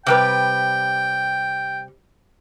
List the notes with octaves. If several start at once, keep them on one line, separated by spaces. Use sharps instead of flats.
C3 G3 B4 G5